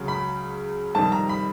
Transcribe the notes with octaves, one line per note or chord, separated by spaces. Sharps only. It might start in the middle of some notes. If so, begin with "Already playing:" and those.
Already playing: C#2 C#3 F#3
B5
F2 C3 D#3 G3 A5
A#5
B5